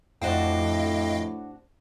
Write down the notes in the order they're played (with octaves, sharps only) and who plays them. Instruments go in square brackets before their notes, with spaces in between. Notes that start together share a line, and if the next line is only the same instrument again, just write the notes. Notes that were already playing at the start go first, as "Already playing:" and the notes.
[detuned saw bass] F2 [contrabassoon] A2 [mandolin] D4 F#4 C5 [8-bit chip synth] D#5 F5 G5